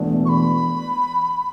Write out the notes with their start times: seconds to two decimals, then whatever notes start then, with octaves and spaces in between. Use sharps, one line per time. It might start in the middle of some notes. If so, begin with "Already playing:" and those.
Already playing: E1 E2 E3 A3 D4
0.25 C#6
0.29 B5